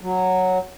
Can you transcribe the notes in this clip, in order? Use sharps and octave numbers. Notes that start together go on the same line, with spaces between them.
F#3